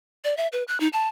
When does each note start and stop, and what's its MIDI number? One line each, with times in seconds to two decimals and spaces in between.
0.24 0.37 74
0.37 0.47 76
0.52 0.63 71
0.68 0.78 90
0.80 0.88 63
0.93 1.08 81